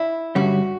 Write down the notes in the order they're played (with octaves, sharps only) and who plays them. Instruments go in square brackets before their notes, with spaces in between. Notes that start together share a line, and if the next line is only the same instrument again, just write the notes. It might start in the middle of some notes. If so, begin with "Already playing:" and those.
Already playing: [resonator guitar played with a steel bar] E4
[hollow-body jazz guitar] G2 D3 G3 C#4 [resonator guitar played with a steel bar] F#4